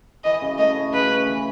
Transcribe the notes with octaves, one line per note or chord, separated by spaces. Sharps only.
E3 D#5
C#3
A3 D#5
C#4
C#3 B4
C#4
E3